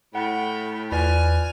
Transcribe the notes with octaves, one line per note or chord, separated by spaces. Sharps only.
A2 F#5 G5
E2 F4 B4 D5 G#5 F6